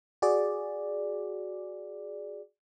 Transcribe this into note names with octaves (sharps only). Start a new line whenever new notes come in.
F#4 G#4 D5